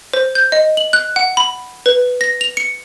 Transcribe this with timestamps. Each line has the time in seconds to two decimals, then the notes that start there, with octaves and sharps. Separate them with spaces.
0.14 C5
0.35 G6
0.52 D#5
0.77 F#7
0.93 F#6
1.16 F#5
1.37 B5
1.86 B4
2.21 A#6
2.41 F7
2.57 C#7